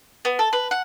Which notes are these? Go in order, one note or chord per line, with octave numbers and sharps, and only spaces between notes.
B3
A4
B4
F#5